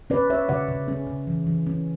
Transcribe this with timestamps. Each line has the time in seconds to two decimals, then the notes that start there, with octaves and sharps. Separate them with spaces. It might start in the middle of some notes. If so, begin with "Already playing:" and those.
0.10 C#4 B4 D5
0.30 C#4 C#5 E5
0.49 C#3 D5 F#5
0.68 C#3
0.88 C#4
1.07 C#3
1.27 E3
1.47 E3
1.67 C#4